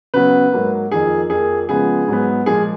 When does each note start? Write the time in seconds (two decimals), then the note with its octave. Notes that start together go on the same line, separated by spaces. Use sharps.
0.14 C#3 F#3 B3 B4
0.52 G#2 F#3 A#3
0.91 F2 D#3 A#3 G#4
1.30 F2 F3 A#3 G#4
1.69 C#3 F3 G#3 B3 G#4
2.08 G#2 F#3 B3
2.46 A#2 F3 G#3 G#4